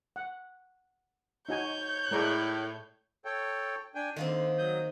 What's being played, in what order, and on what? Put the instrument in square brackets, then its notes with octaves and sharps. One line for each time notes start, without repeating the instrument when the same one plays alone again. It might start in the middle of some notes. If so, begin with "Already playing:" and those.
[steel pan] F#5
[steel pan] D#4 F#4 G#5 [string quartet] C#5 [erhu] G6
[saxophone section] A2 [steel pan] G#3 A#4 D5
[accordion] A4 C#5 G5
D4 G5 G#5
[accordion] D3 [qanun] D#3 A#3 C4
[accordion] F#3 D#6 G6